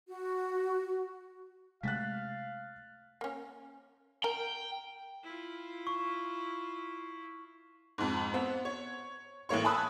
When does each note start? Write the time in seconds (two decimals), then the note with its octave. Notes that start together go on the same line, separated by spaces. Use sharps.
0.09 F#4
1.83 C3 G#3 A3 F5 F#6 A6 B6
3.21 A#3 C#4
4.24 A#4 G5
5.23 E4 F4
5.87 C#6
7.98 F2 G#2
8.34 B3 C4
8.65 C#5
9.49 A1 A2 A#3 C#5 C#6
9.65 G#5 A5 B5 D#6 E6 F#6